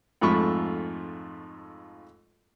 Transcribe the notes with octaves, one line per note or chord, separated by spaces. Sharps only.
F2 G#2 A3 F4 B5 C#6